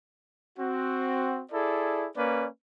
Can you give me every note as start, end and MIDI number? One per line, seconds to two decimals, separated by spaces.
0.58 1.41 60
0.58 1.41 66
1.52 2.07 64
1.52 2.07 68
1.52 2.07 69
1.52 2.07 74
2.15 2.47 58
2.15 2.47 61
2.15 2.47 71
2.15 2.47 74